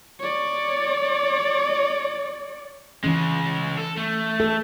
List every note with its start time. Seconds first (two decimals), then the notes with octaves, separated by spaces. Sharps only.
0.20 C#5 D5
3.04 C#3 E3 G#3 C#4
3.77 A4
3.97 A3
4.40 A4